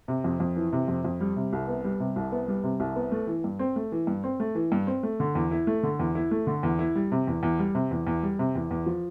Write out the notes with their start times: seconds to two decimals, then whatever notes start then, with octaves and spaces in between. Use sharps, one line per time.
0.08 C3
0.24 F2
0.40 F2
0.56 E3
0.72 C3
0.88 F2
1.05 F2
1.21 G3
1.36 C3
1.53 C2
1.68 B3
1.84 G3
2.00 C3
2.16 C2
2.32 B3
2.48 G3
2.64 C3
2.80 C2
2.96 B3
3.12 A3
3.27 E3
3.44 G2
3.59 C4
3.76 A3
3.92 E3
4.07 G2
4.24 C4
4.40 A3
4.55 E3
4.72 G2
4.87 C4
5.03 A3
5.20 D3
5.35 E2
5.51 E4
5.67 A3
5.83 D3
5.99 E2
6.15 E4
6.31 A3
6.47 D3
6.63 E2
6.79 E4
6.96 G3
7.12 C3
7.27 E2
7.43 E2
7.59 G3
7.75 C3
7.91 E2
8.07 E2
8.23 G3
8.39 C3
8.55 E2
8.71 E2
8.86 F3